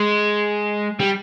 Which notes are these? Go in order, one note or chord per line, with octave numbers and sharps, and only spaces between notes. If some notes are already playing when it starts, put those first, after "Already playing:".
Already playing: G#3
G3